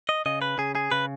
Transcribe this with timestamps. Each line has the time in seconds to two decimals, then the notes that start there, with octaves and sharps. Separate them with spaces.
0.09 D#5
0.26 C#3 D#5
0.42 B4
0.58 C#3 G#4
0.75 G#4
0.92 C#3 B4